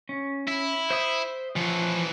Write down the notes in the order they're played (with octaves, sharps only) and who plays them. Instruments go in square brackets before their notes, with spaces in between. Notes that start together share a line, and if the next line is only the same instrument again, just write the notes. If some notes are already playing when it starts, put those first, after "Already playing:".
[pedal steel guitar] C#4
[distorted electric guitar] E4
[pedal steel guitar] C5 E5 D#6
[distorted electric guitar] E3 C#5 [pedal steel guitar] F3